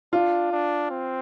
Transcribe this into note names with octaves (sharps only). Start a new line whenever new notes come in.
D4 F4
D4
C4